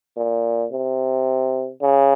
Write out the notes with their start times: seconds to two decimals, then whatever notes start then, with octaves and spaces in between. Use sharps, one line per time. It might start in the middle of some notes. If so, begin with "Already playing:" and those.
0.17 A#2
0.72 C3
1.81 C#3